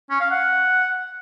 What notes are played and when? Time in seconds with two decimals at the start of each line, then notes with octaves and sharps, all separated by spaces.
0.10 C#4
0.20 F5
0.30 F#5